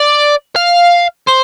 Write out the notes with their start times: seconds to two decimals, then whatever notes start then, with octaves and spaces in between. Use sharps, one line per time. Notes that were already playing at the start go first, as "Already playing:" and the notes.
Already playing: D5
0.56 F5
1.28 C5